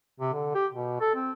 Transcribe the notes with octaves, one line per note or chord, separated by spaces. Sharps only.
C3
D3
G4
B2
A4
C4